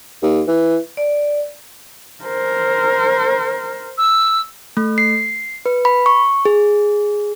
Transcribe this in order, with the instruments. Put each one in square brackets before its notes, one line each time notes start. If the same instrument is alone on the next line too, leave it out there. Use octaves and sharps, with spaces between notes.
[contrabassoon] D#2
E3
[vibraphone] D5
[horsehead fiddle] A#4 C5
[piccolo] E6
[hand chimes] A3
C7
B4
B5
C#6
G#4